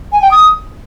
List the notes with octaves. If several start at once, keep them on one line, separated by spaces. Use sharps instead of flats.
G#5
G5
D#6